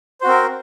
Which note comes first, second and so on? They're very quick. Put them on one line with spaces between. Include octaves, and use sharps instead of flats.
C5 F#4 C4 A#4